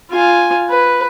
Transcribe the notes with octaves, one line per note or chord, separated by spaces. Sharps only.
F4 G#5
B4